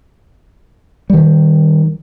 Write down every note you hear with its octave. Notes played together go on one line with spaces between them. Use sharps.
D#3 G3